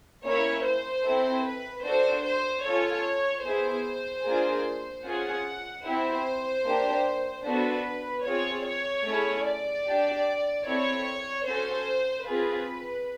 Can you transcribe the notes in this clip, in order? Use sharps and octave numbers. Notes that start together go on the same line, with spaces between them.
A#3 C#4 E4 C#5
C5
C4 E4 A4
B4
D4 F#4 A4 C5
C5
C#4 F4 A4 C#5
B3 E4 G#4 C5
A#3 D4 F4 G#4
C#4 F4 G#4 F#5
C4 E4 G4 C5
A#3 D4 G4
B3 D4 F#4 A4 B4
C4 F4 G#4 C#5
C#5
A3 C#4 E4 G#4
D5
D4 G4
C4 E4 A4 C#5
C#4 F#4 A4 C5
C4 F4 G#4 B4